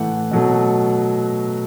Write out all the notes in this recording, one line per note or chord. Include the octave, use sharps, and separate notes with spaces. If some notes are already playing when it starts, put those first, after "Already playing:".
Already playing: A2 E3 A3 F#5
B2 F#3 A3